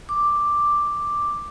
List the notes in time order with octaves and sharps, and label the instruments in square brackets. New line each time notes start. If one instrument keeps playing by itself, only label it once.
[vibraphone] D6